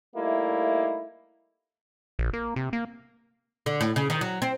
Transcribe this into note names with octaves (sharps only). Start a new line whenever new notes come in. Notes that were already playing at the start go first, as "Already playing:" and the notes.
G3 A3 A#3 D#4 E4
A#1
A#3
C3
A#3
D3
A2
C#3
D#3
F#3
C4